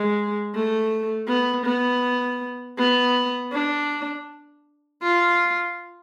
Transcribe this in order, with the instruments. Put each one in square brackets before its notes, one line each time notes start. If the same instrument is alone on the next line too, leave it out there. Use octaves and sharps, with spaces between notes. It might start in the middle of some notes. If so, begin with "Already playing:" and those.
Already playing: [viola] G#3
A3
B3
B3
B3
D4
F4